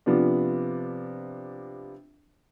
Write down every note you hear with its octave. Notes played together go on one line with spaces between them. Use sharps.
C3 F3 B3 D4